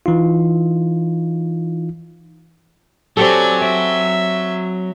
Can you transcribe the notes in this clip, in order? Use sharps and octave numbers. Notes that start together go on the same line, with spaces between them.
E3 D#4 F4
F#3 C4 G4 A4 D5 G#5
D5 E5